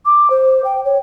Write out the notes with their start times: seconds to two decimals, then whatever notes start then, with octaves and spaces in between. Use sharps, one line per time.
0.05 D6
0.30 C5
0.64 G5
0.85 C#5